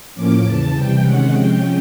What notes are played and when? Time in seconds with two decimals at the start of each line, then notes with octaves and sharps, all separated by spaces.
0.15 A2 F3 A#3 C#4 D6
0.44 E2 C#3 E3 A5
0.73 C3 E3 G3 G5
1.03 C3 D#3 G#3 C#4 F#5
1.32 C3 F3 G#3 C#4 G5